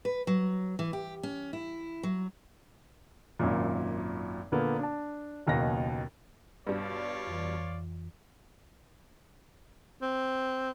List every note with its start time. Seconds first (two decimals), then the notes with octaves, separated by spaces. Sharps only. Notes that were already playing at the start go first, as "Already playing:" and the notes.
0.05 B4
0.27 F#3
0.79 E3
0.93 G4
1.23 C#4
1.53 E4
2.03 F#3
3.39 G#1 F#2 A#2
4.52 A#2 D3 A#3 B3
4.79 D4 A5
5.47 F#1 D#2 B2 D#4 A#6
6.67 G2 B2 G3 F4 C#5 D5
7.27 F2 E3
10.02 C4